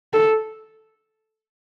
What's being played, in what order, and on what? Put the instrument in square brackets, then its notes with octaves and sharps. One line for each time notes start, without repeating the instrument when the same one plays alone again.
[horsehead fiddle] A4